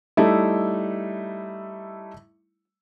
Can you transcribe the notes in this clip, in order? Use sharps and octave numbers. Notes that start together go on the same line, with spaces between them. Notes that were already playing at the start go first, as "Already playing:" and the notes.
G3 A3 D#4 E4